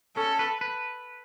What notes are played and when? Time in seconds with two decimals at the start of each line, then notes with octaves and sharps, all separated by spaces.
0.16 C#4 A4
0.39 B4
0.61 B4